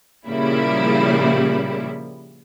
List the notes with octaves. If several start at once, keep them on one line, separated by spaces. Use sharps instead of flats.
A#2 C#3 F3 G3 A#3 E4